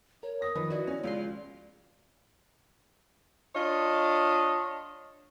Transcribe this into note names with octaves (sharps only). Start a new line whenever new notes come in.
A#4 C#5
D#6 A#6
D#3 F3 B4
E4 F#4 D5
C#4
C#2 F4 B4 C6
D4 F4 C#5 D#5